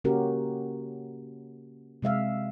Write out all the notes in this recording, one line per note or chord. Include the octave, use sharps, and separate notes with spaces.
C#3 A#3 C#4 F#4 G4 A#4
C3 G#3 E5 F5